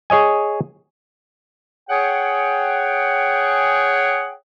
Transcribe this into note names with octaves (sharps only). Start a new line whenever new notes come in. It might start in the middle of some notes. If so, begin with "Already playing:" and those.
G#4 C#5 D#5 G#5
G#4 C#5 F#5 G5